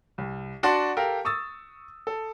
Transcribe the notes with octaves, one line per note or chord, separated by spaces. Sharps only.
C2
D4 F#4 D5 F#5 A5 C6
G4 A4 A#4 F5
C#6 D#6 E6 A6
A4